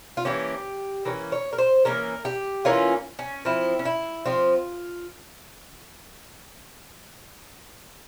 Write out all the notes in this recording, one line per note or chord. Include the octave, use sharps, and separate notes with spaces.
F4
E3 A#3 C#4 G4
E3 A#3 C#4
C#5
A#4
C5
E3 A#3 C#4 A#4
G4
E3 A#3 C#4 F4
C#4
F3 C4 E4
C#4
E4
F3 C4 F4